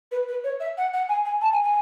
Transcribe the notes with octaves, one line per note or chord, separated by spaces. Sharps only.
B4
B4
C#5
E5
F#5
F#5
G#5
G#5
A5
G#5
G#5